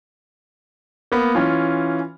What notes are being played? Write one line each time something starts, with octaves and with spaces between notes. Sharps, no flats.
A#3 B3
E3 C#4 F4